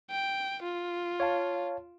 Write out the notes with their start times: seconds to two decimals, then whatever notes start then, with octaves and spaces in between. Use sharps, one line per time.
0.11 G5
0.63 F4
1.20 C#5 F5 A5